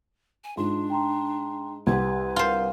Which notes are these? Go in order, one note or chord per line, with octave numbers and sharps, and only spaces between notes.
G#5
G#2 D4 F4 C6
G5 A#5 C6
C2 G4 B4 F#5 C6 G#6
F4 A#4 C5 F#5